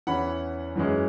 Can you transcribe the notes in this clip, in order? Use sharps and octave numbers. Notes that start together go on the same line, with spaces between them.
E2 E3 C#4 F#5 B5
F#2 E3 G#3 C#4